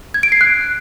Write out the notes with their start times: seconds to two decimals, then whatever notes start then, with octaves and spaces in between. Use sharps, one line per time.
0.14 G#6
0.23 D7
0.32 C7
0.41 F#6